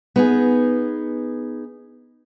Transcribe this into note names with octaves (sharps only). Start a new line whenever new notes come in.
B3 D#4 G#4